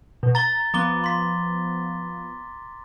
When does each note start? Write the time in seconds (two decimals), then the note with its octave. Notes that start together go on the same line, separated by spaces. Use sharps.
0.23 B2
0.35 A#5 A6 G7
0.74 F3 B3 A#5 D6 G7
1.04 C6 B6